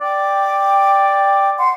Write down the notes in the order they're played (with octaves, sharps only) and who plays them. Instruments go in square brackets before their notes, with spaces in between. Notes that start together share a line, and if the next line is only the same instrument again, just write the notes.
[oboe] D5 [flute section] G5 D6
[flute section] F#5 C6